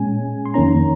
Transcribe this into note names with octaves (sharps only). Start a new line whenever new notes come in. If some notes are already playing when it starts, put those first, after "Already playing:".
Already playing: A#2 G#3 C#4 G#5
C6
F2 D#3 A#3 C#4 A#5